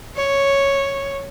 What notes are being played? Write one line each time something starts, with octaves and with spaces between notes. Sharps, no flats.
C#5